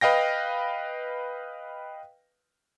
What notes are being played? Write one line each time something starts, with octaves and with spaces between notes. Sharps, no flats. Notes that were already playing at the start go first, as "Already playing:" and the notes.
B4 D#5 F5 G5 A#6